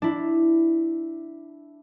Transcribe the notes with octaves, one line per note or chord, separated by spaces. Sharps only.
D4 E4